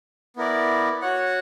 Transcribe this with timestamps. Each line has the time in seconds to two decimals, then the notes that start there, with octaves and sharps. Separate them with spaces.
0.36 B3 E4 A#4 D5
1.02 F#4 C#5 F#5